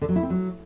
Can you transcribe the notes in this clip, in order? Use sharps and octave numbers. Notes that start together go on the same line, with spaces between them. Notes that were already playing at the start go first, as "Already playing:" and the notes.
D3
F#3
E4
C4
F#3